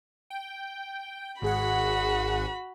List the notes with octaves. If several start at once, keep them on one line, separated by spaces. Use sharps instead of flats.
G5
G#1 F#4 G#4 F#5 B5